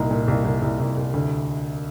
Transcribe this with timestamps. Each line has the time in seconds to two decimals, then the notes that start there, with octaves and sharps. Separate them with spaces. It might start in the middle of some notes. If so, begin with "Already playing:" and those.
Already playing: C2 A#2 D#4
0.11 A#2
0.28 C2
0.45 C2
0.62 C2
0.80 C2
0.97 C2
1.14 D2